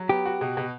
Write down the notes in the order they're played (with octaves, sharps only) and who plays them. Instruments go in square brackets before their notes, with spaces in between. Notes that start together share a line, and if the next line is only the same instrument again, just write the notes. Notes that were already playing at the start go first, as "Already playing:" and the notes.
Already playing: [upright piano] F#3
[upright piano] B3 [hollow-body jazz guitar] G4
[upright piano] F#4
B2
B2